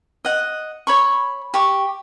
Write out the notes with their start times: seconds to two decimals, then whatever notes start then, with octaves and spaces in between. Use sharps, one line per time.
0.25 D#5 F#5
0.87 C#5 B5 C#6
1.54 G4 C#6